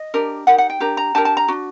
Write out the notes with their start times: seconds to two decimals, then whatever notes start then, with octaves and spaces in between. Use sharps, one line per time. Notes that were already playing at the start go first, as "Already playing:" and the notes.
Already playing: D#5
0.14 D4 G4 A#4
0.47 D#4 G4 A#4 F#5
0.58 F#5
0.70 G5
0.80 D4 G4 A#4 A#5
0.97 A#5
1.15 D4 G4 A#4 A5
1.25 A5
1.37 A#5
1.48 D4 F#4